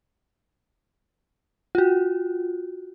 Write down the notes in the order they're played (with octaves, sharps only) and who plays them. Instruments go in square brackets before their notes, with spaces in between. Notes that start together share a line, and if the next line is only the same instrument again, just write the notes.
[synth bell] F4 F#4